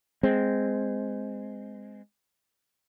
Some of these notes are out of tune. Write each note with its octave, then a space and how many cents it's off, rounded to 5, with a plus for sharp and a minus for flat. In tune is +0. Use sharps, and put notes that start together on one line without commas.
G#3 +0 C4 -15